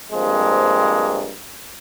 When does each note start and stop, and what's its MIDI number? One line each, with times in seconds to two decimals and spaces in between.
0.12 1.32 43
0.12 1.32 53
0.12 1.32 56
0.12 1.32 58
0.12 1.32 60